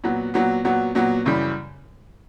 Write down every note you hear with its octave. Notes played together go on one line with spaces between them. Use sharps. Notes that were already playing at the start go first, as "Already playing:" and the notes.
A#2 F#3 B3
A#2 F#3 B3
A#2 F#3 B3
A#2 F#3 B3
F#2 C#3 E3 G3